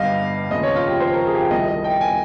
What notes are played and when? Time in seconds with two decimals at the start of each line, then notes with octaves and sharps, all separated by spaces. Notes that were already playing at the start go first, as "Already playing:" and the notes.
Already playing: G1 G2 G3 D#5 F5
0.50 F1 D#2 C#3 F3 G#3 D#5
0.63 C#5
0.76 F4
0.88 G4
1.00 C5
1.14 A#4
1.26 G#4
1.35 G4
1.39 F4
1.51 C2 C3 D#3 G3 D#5
1.68 D#5
1.84 G5
2.01 G#5